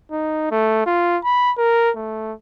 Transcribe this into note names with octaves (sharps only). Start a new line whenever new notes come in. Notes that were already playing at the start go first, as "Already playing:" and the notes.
D#4
A3
F4
B5
A#4
A3